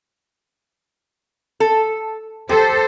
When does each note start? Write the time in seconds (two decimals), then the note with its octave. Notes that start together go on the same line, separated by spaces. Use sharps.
1.60 A4
2.49 G4 A4 C5